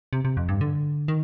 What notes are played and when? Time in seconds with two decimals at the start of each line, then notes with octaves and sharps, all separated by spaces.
0.13 C3
0.25 C3
0.37 F2
0.48 G2
0.61 D3
1.08 D#3